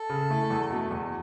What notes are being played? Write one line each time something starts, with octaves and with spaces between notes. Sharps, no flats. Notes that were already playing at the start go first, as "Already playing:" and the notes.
Already playing: A4
C#3
A3 E4
E2
B2 A3
E2